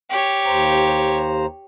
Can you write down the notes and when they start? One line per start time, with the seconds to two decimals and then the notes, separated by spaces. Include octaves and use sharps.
0.10 G4 C#5
0.46 D#2 C5 A#5